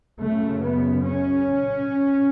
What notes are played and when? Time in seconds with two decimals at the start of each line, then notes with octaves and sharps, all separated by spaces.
0.18 F#2 C#3 A3
0.61 B3
1.06 C#4